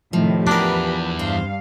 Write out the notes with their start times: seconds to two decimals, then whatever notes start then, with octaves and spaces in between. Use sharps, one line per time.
0.13 A2 C3 D#3 F3
0.47 E2 D4 G4 A#4 B4
1.19 G2 C5 F5